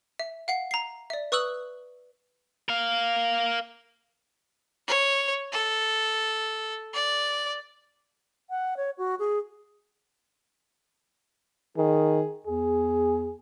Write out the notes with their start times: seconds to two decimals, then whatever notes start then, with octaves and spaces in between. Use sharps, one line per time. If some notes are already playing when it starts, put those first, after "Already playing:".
0.19 E5
0.48 F5 F#5 C7
0.71 A#5 C7
1.10 D5 E5
1.32 B4 C#6 D#6 E6 F#6 F#7
2.69 A#4 F5
4.87 C#5
5.52 A4
6.94 D5
8.50 F#5
8.77 C#5
8.98 F#4
9.19 G#4
11.77 D#3 G#4
12.46 E2 G#4